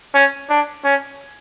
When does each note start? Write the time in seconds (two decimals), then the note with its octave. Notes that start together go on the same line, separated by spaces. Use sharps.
0.14 C#4
0.50 D4
0.84 C#4